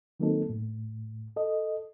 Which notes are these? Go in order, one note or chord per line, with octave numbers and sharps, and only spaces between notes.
D#3 F#3 A#3 C4 D#4 A4
A2
A4 D#5